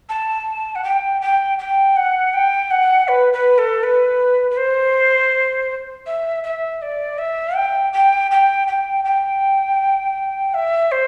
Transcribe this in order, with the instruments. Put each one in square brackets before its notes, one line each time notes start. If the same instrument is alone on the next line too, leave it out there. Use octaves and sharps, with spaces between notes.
[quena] A5
F#5
G5
G5
G5
F#5
G5
F#5
B4
B4
A4
B4
B4
C5
E5
E5
D5
E5
G5
G5
G5
G5
G5
E5
C5